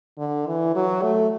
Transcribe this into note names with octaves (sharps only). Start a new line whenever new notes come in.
D3
E3
F#3
A3